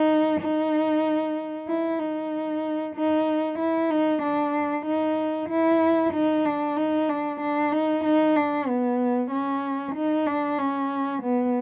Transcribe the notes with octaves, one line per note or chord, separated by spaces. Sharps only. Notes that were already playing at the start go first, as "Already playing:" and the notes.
Already playing: D#4
D#4
E4
D#4
D#4
E4
D#4
D4
D#4
E4
D#4
D4
D#4
D4
D4
D#4
D#4
D4
B3
C#4
D#4
D4
C#4
B3